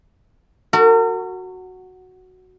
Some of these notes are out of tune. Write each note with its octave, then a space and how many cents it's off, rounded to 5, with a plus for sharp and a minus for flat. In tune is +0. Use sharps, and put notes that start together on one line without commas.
F#4 +0 A#4 -40